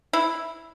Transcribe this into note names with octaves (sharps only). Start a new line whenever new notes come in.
E4